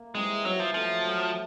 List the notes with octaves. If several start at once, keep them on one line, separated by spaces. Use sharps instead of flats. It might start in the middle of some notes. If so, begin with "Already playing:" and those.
Already playing: A#3
E3 G3 G#3 C4 D#4
E3 F#3 G3 C4 D#4
F3
F3 F#3 A3 C4
F#3 A3 C4